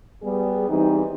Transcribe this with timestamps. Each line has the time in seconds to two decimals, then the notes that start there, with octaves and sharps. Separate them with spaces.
0.23 G3 B3 G#4
0.70 E3 G3 C4 D#4